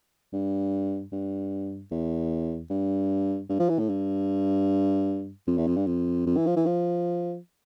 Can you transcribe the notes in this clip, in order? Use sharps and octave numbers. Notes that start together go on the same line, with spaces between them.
G2
G2
E2
G2
G2
F3
E3
A2
G2
F2
E2
F2
G2
F2
F2
E3
F3
E3
F3